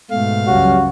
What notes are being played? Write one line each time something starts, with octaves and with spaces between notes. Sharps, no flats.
G#2 B2 A3 F5
C#2 F#2 G3 C#4 F#4